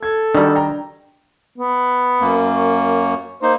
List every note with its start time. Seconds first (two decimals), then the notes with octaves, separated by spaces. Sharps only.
0.03 A4 G#6
0.35 D#3 G3 D4 D#4 F#4
0.56 G5 A#5
1.58 B3
2.20 F#2 A#3
2.54 C#5
3.43 A#3 D#4 C5